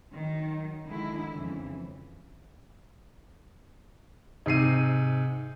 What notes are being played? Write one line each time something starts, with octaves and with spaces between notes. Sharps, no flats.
D#3 F#3
D3 D#3 G#3 E4
F2 C#3 E3
G#2 C3 C7 D#7